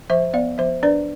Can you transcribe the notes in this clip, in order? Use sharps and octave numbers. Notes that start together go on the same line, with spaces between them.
F3 C5 E5
B3 D5 F5
F3 C5 E5
D4 B4 D5